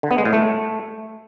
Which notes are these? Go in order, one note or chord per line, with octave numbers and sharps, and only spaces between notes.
D3
B3
G#3
A2
A3